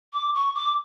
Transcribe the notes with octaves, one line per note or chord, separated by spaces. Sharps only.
D6
C#6
D6